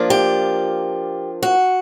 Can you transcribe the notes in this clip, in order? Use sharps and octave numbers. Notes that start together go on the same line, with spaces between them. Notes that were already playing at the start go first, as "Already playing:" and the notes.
Already playing: F3 A#3 D4 F4
G4
F#4